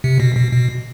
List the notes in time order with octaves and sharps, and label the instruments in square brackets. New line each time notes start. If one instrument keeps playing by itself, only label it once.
[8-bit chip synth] C3
B2
B2
B2